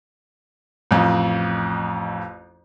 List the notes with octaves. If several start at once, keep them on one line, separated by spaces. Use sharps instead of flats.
A1 F2